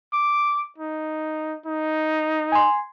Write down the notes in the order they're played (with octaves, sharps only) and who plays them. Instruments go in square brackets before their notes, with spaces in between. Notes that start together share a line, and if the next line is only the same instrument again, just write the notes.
[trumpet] D6
D#4
D#4
[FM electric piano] G#5 C6